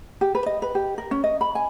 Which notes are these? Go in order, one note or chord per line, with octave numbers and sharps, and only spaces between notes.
G4
B4
D#5
B4
G4
A#4
C#4
D#5
B5
G#5